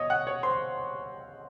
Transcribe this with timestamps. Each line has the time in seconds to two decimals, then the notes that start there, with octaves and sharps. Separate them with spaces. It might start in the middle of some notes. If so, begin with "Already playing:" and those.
Already playing: B2 C#5 D#5 D#6
0.10 F#5 F#6
0.27 C#5 C#6
0.43 C5 C6